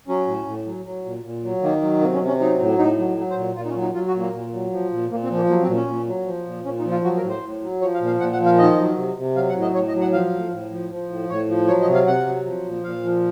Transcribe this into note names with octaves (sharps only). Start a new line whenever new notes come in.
F#3 C#4
A2
A2
F#3
F#3
A#2
A#2
F#3
D#3 A#3
F#3
C3 A#3
C#4
C3
C#4
F#3 D#4
A2
A2 D#4
F#3
F#3
C5
A#2
A#2 F4
D#4
C#4
F#3
D#4
F#3 F4
F#4
A#2
A#3
A#2
F#3
F3
A#2
A#2 A#3
C4
F3
A#3
F#3 A#3
C4
A#2
C#4
A#2
F#3
F3
A#2
A#2 C#4
D#4
F3
F4
F#3 F#4
A#4
A2
C5
A2
F#3
F3 C#5
F5
A#2
F5
A#2 F#5
F#5
F3
F5
D#3 D#5
F#3
C3
C3
F#3 F5
F#5
A2
D#5
A2 C#5
D#5
F#3
F#5
F3 F5
A2
A2
F3
F3
A2
A2 C#5
F3
F#3 C#5
D#5
C3
F5
C3 F#5
F#3
F3
A#2
A#2 F5
F3